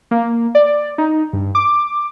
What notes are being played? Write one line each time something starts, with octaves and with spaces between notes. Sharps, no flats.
A#3
D5
D#4
G2
D6